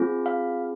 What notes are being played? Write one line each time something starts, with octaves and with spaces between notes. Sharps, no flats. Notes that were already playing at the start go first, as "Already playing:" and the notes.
Already playing: C4 F4 G#4
F5